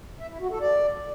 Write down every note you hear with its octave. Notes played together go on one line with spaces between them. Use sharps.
E5
E4
F#4
A4
D5